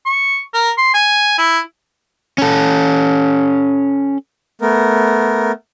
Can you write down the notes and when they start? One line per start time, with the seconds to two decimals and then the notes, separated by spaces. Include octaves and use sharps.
0.06 C#6
0.54 A#4
0.78 C6
0.94 G#5
1.38 E4
2.38 C#4 A4
4.62 A3 B3 A#4